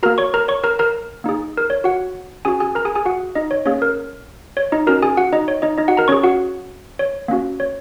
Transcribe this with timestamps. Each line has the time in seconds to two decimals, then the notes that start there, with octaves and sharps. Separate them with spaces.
0.03 A#3 F#4 A#4 A#5
0.18 C#5 C#6
0.34 A#4 A#5
0.48 C#5 C#6
0.64 A#4 A#5
0.79 A#4 A#5
1.24 A#3 D#4 G#4
1.57 A#4
1.70 C#5
1.84 F#4 F#5
2.45 C#4 F#4 G#4 G#5
2.60 G#4 G#5
2.75 A#4 A#5
2.85 G#4 G#5
2.95 G#4 G#5
3.06 F#4 F#5
3.35 D#4 D#5
3.51 C#5
3.66 A#3 C#4 G#4 C#5
3.82 A#4
4.57 C#5
4.72 D#4 D#5
4.87 C#4 F#4 A#4 A#5
5.03 G#4 G#5
5.17 F#4 F#5
5.33 D#4 D#5
5.48 C#5
5.62 D#4 D#5
5.78 D#4 D#5
5.88 F#4 F#5
5.97 A#4 A#5
6.08 C#4 G#4 C#5 C#6
6.24 F#4 F#5
6.99 C#5
7.28 A#3 C#4 F#4
7.60 C#5